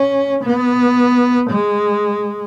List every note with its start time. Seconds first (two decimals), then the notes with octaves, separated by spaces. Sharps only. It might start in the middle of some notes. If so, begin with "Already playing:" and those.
Already playing: C#4
0.44 B3
1.50 G#3